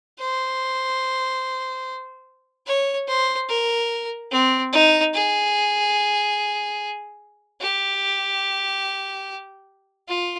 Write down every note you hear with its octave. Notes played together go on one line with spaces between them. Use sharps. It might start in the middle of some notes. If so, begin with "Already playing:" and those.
C5
C#5
C5
A#4
C4
D#4
G#4
G4
F4